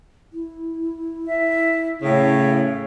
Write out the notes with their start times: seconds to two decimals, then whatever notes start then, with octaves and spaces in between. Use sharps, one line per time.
0.33 E4
1.27 E5
2.02 A2 C#3 C#5